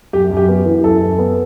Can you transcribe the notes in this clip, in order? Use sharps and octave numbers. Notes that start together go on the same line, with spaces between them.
F#2 G4
F#2
G4
B3
E3
F#2 A4
F#2
B3